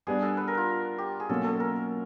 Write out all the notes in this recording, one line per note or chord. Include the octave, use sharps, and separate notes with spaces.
G3 B3 D4 G#4
A4
B4
A#4
F4
G4
G#4
B2 F#3 A#3 C#4 A4
A4
A#4